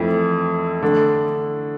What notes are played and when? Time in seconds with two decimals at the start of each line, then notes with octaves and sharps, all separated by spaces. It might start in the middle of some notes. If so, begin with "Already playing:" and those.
Already playing: F2 E3 A3 C4 E4
0.82 D3 A3 D4